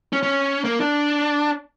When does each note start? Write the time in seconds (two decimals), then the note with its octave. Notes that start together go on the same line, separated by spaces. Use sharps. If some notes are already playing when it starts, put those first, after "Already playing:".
0.13 C#4
0.23 C#4
0.64 A#3
0.80 D4